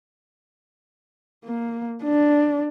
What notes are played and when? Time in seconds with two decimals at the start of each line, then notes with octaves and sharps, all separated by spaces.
1.45 A#3
2.04 D4